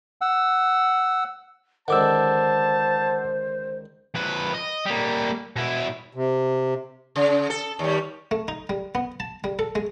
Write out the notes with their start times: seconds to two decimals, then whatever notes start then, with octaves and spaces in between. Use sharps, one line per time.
0.21 F#5 E6
1.88 C#2 D3 D#3 C5 F#5 A5 D6 E6
4.15 F2 B4
4.53 D#5
4.85 G3 A#3
5.56 B2 E4
6.15 C3
7.16 C#3
7.50 A4
7.79 D#2 G3
8.31 A3
8.48 D#4
8.69 G3
8.95 B3
9.20 A5
9.44 G3
9.59 A4
9.75 G#3